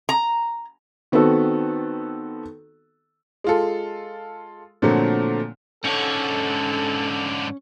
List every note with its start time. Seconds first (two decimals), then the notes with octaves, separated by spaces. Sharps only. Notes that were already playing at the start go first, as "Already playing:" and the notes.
0.09 A#5
1.12 D#3 B3 C4 F#4 A4
3.44 G#3 F4 A4
4.82 A#2 D3 F3 F#3 A3 C4
5.84 G#2 D3 C#4 A4 C#5